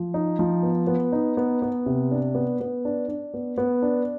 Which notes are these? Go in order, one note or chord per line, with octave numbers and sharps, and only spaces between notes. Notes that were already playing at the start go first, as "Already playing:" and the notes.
Already playing: F3
D#4
F3
B3
B3
D#4
B3
B3
C3
D4
B3
B3
D4
D4
B3
B3
D4